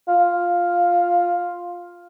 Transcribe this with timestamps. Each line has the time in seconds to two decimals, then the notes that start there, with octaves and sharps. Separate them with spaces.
0.08 F4